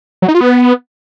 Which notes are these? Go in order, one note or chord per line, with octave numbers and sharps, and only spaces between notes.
F#3
D#4
F4
B3